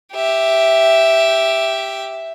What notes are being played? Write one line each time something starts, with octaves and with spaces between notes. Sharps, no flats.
G4 E5